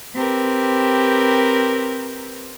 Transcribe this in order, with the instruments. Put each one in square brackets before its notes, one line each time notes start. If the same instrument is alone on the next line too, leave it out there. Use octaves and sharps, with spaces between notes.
[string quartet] C4 G4 A#4 B4